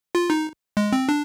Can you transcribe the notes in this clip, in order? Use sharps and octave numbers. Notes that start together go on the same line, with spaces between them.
F4
D#4
G#3
C4
D4